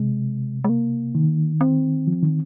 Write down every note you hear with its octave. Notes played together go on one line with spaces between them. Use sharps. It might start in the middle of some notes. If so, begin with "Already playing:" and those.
Already playing: C3 G#3
G#3
A#3
D#3
C4
F3
D#3